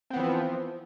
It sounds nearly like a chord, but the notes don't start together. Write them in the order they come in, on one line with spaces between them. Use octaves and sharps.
C4 B3 E3 F3